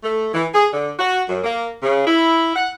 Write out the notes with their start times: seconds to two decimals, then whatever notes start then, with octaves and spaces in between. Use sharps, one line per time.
0.04 A3
0.34 E3
0.55 G#4
0.73 D3
0.99 F#4
1.29 F#2
1.44 A#3
1.83 C#3
2.07 E4
2.56 F#5